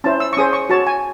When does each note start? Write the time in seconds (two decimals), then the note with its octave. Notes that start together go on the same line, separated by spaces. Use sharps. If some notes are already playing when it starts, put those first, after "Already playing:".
0.04 C#4 E4 C5 A5
0.20 E6
0.33 C#6
0.37 C#4 G#4 C5 D#6
0.53 C#6
0.69 F#4 C#5 A5
0.87 G#5